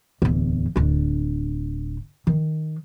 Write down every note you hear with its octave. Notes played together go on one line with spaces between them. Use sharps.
D1 E2
D1 D4
D#3